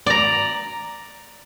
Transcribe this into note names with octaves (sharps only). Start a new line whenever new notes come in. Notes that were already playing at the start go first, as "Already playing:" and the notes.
D5 A#5